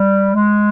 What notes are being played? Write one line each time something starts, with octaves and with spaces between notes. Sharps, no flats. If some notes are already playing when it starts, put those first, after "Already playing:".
Already playing: G3
G#3